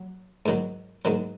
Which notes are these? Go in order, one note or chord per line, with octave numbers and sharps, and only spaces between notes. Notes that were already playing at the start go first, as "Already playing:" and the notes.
Already playing: F#3
G#2 D#3 F#3
G#2 D#3 F#3